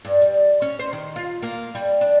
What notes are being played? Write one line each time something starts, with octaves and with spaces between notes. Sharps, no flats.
G2
G3
C#4
C5
D#3
F4
A#3
G3
D4